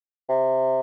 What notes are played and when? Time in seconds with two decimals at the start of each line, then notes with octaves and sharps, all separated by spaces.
0.29 C3